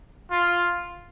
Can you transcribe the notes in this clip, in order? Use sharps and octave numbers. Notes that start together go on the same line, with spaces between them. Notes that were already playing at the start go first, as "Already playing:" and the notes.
F4